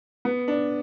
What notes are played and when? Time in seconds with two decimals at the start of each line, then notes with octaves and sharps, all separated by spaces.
0.25 B3
0.48 D4